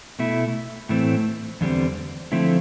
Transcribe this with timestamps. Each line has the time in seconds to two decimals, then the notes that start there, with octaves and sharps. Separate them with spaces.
0.19 B2 A3 E4
0.89 A2 E3 A3 C4
1.61 E2 D3 G3 C4
2.32 D3 F3 A3 C4 E4